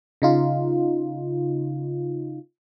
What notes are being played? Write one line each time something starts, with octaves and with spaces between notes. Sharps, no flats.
C#3 D#4 F4